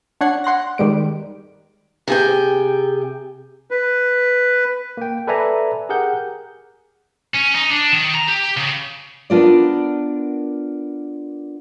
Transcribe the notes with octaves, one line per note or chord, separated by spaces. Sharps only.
D4 C#5 F#5 G#6 C7
F#5 C6 F#6 A#6
D#3 G3 G#3 D7
C3 G#4 G5
B4
A#3 G5
A4 B4 D5 E5 G#5 A#5
G4 G#4 A#4 F#5 G6
C#4
D#4
D4
D#3
A#5
G4
C#3
B3 D4 F4 A#4 D5